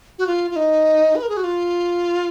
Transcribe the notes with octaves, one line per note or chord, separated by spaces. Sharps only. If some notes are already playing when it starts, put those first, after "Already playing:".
F#4
F4
F4
D#4
B4
A#4
G#4
F#4
F4